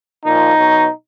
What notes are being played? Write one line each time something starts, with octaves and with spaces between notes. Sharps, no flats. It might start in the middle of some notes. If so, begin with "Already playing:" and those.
A#2 F3 D#4
B2 F#3